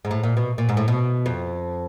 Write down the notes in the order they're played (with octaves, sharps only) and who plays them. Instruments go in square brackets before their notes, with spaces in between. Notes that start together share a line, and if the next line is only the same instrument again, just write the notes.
[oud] G#2
A2
A#2
B2
A#2
G#2
A2
B2
F2